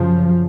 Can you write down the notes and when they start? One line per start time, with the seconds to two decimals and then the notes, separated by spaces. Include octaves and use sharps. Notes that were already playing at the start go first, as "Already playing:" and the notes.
Already playing: F#2 C#3 F3